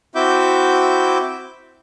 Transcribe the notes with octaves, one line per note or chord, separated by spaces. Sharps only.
C4 E4 F#4 E5 D6 G6